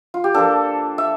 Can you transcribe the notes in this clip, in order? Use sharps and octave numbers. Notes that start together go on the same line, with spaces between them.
F4
G4
F3 A#3 D4 A4
E5